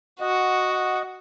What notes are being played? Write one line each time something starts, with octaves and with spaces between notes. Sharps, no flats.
F#4 D#5 F#5